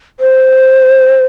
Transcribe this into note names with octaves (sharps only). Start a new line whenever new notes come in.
C5